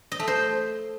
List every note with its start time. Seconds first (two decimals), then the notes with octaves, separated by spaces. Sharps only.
0.12 D#5
0.20 A3
0.27 C5